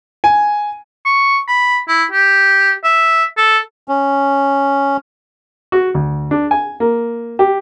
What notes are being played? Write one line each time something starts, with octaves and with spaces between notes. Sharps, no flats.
G#5
C#6
B5
E4
G4
E5
A4
C#4
F#4
D2
D4
G#5
A#3
G4